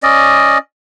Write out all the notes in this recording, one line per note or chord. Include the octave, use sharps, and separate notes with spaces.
C#4 D5 D#5